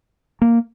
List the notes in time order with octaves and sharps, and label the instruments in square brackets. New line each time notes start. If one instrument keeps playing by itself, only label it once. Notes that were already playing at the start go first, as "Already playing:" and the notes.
[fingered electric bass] A#3